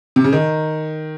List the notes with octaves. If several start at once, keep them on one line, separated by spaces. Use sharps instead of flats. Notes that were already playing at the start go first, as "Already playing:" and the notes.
C3
C#3
D#3